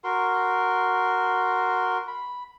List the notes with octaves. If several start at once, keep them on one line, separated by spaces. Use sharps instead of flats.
F#4 A#4 C6
B5